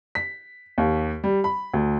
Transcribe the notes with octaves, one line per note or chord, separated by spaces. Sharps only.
B6
D#2
G3
B5
D2